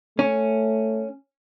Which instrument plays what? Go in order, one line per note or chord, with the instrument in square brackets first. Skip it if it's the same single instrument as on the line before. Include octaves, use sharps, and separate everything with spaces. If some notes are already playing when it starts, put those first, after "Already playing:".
[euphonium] A3 [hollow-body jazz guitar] C#4